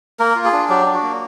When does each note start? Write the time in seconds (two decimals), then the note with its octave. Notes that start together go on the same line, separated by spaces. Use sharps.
0.19 A#3 A#4
0.36 F4
0.45 G#4
0.53 D4
0.69 F#3 G4
0.86 D4
0.95 F#4
1.03 A#3